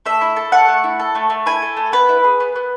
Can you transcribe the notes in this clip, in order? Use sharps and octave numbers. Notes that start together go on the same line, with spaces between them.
A3 E5
E4
A4
A3 F#5
A3
E4
A4
A3
A3
E4 G#5
A4
A3
B3 B4
E4
G#4
B3
B3